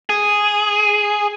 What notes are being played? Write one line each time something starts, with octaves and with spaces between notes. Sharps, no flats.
G#4